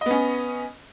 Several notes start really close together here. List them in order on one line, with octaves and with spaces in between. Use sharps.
D#5 B3 C#4